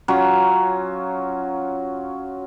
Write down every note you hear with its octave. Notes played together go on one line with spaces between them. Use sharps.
F#3 C#4 F4